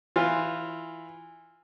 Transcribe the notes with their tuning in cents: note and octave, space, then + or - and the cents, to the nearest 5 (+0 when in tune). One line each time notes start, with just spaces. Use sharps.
E3 +0 F4 +0